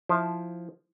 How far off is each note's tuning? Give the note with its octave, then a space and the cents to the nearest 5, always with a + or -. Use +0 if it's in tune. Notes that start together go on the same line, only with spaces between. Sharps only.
F3 +0 E4 +5 C5 +0